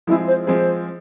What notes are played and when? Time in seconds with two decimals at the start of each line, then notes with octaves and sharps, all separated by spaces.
0.07 F3 G#3 C4 E4 G#4
0.28 C5
0.46 F3 G#3 C4 G#4 C5